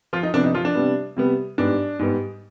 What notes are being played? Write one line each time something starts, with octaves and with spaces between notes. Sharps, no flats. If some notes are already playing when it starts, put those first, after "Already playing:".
F3 F4
D#4
C3 F3 B3 D4
D#4
F3 F4
D4
C3 G3 B3
C3 G3 B3
G#2 G3 B3 D4
G#2 G3 B3